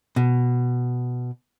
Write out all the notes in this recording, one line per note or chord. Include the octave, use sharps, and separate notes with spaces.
B2